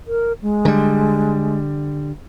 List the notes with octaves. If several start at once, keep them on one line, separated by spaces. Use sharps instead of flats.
A#4
G#3
D3 G3